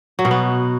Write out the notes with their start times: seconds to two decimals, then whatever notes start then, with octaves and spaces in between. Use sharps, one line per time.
0.19 F#3
0.25 B2
0.31 B3